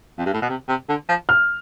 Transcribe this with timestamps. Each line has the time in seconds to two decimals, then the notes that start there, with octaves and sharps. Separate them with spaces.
0.18 F2
0.26 G2
0.33 A2
0.42 B2
0.49 C3
0.68 C3
0.89 D3
1.08 F3
1.29 F6